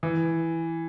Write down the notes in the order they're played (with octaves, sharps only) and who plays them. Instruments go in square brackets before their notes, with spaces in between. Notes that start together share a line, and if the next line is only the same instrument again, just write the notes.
[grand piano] E3